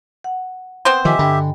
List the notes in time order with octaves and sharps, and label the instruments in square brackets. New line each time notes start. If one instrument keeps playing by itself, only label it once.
[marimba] F#5
[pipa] B3 C4 C5
[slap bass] D#3 F3 [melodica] G4 E5 [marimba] D#5 G#5
[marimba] G2 G5 [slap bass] D3